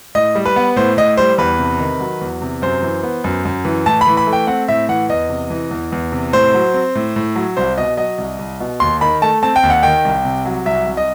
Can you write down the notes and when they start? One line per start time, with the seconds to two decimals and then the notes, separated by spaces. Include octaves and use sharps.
0.15 A2 D#5
0.35 G3
0.46 B4
0.56 B3
0.76 A2 C5
0.97 A2 D#5
1.17 G3 C5
1.38 E2 B4
1.59 C3
1.80 D#3
2.00 F#3
2.21 E2
2.42 C3
2.62 F#2 C5
2.82 E3
3.03 B3
3.24 F#2
3.45 F#2
3.65 E3
3.86 A2 A5
4.01 B5
4.07 E3
4.17 B5
4.27 A3
4.33 G5
4.47 C4 F#5
4.68 A2 E5
4.89 E3 F#5
5.09 E2 D#5
5.30 C3
5.50 E3
5.71 E2
5.92 E2
6.12 C3
6.33 A2 C5
6.54 F#3
6.74 C4
6.95 A2
7.16 A2
7.36 F#3
7.57 C2 C5
7.78 B2 D#5
7.97 F#3 D#5
8.18 C2
8.39 C2
8.60 B2
8.80 D#2 C6
9.01 D#3 B5
9.22 A3 A5
9.43 C4 A5
9.56 G5
9.63 D#2
9.70 F#5
9.83 D#3 G5
10.05 C2
10.25 C3
10.45 F#3
10.65 C2 E5
10.87 C2
10.97 D#5